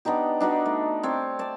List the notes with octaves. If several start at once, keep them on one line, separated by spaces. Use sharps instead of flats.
B3 D4 D#4 G4
D4 D#4 F#4 B4
A3
C4 C#5 D5
D5 A5